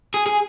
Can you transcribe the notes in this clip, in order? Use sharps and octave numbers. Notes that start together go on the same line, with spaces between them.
G#4
G#4